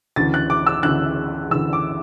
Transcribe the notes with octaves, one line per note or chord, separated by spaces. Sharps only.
D2 C#3 E3 A6
F#6
D6
E6
D2 C#3 E3 F#6
D2 C#3 E3 E6
D6